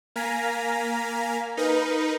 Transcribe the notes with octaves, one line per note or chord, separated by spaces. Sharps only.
A#3 F5 G#5 A#5 B6
D#4 A#4 B4